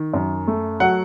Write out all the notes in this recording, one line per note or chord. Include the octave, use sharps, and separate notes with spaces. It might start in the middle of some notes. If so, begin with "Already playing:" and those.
Already playing: D#3
F#2
A3
F#3 F#5